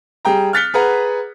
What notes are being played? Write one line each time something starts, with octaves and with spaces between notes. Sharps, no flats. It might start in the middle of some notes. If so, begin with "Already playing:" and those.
G3 G#4 G5 A#5
F6 F#6 A6 B6 C#7 G7
G#4 B4 F#5 A#5